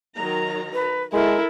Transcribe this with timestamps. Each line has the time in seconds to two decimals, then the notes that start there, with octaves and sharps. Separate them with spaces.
0.16 D#3 F#3 A#5
0.73 B4
1.13 G#3 E4 A4 A#4